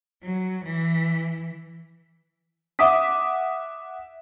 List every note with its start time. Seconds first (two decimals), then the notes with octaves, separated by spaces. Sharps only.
0.23 F#3
0.65 E3
2.79 E5 F#5 D6 D#6 B6